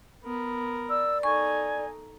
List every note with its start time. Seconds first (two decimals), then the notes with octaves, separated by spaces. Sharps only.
0.24 B3 A#4
0.90 D5 E6
1.23 D#4 A4 G#5 C#6